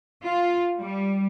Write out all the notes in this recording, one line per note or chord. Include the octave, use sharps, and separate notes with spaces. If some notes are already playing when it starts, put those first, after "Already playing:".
F4
G3